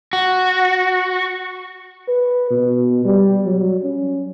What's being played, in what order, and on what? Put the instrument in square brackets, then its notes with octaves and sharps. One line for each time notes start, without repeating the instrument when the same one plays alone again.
[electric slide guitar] F#4
[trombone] B4
B2
G3
F#3
C#4